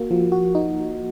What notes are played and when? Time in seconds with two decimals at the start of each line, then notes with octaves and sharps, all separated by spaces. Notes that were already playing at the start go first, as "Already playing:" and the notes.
Already playing: A#3 F#4
0.11 F3
0.32 F#4
0.55 D#4